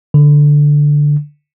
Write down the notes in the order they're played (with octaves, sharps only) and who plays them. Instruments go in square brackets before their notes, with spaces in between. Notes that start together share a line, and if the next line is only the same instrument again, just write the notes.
[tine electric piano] D3